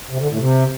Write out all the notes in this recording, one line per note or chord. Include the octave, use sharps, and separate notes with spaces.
C3
D3
A2
C3